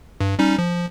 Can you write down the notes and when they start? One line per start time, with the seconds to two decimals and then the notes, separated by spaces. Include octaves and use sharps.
0.21 G2
0.39 G3 C#4 D#4
0.58 F3